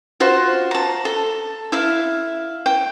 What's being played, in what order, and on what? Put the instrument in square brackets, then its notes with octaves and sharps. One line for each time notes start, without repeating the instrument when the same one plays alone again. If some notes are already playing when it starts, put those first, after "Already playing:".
[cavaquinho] F4 F#4 C5
A5 A#5
A4
E4 E5 F5
G5